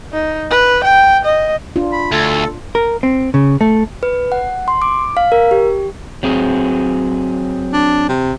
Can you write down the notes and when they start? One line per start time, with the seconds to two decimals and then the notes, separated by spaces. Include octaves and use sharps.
0.12 D#4
0.50 B4
0.84 G5
1.24 D#5
1.76 D4 F4
1.92 B5
2.12 D2 A4
2.75 A#4
3.03 C4
3.34 C#3
3.61 A3
4.03 B4
4.32 F#5
4.68 C6
4.82 D6
5.17 F5
5.32 A#4
5.51 G4
6.23 F#3 C4 G#4
7.73 D4
8.09 C3